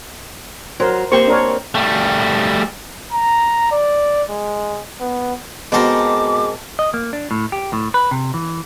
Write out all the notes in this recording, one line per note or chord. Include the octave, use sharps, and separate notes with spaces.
F#3 A#4 C5
A#3 C4 G4 C5 C#6
D4 A#4 C#5
G3 A3
A#5
D5
G#3
B3
B2 G#3 C4 A4 A#4 C5 D6
D#5
A#3
D4
A2
G4
A2
B4
C3
E3